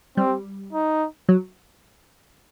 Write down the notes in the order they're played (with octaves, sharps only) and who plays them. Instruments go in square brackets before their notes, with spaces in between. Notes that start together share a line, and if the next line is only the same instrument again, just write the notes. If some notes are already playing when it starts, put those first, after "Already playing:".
[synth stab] G3 [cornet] C4
[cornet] D#4
[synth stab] F#3